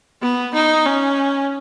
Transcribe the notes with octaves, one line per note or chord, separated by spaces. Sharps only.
B3
D#4
C#4